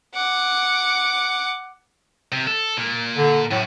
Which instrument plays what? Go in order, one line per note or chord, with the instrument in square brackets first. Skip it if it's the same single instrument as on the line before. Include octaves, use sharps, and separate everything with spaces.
[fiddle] F#5 D6
[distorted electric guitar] C3
A4
A#2
[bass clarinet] D3
[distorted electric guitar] F#2 F#4 [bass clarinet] A2